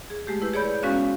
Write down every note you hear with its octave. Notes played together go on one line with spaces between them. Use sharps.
G#4
G#3 A3 G4
E4 B4 G6
G#4 C#5 D5 B5 G6
G#3 B3 C#4 F#4 F5 F#6